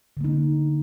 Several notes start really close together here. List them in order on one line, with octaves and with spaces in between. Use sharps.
D3 A#3 D#4